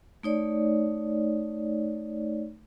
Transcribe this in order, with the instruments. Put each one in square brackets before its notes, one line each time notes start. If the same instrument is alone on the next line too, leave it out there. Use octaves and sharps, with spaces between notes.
[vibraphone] A3 D#4 C#5 D5